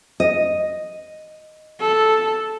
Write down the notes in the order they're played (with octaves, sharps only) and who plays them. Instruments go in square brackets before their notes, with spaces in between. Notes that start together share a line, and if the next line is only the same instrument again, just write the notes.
[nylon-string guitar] D#5
[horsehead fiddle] A4